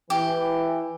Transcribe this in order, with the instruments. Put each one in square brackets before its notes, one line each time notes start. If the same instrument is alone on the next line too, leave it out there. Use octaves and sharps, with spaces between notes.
[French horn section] E3 [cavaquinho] G4